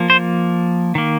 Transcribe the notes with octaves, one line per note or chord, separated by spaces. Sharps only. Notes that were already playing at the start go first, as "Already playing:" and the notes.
Already playing: F3 A#3
C5
D#3 A#3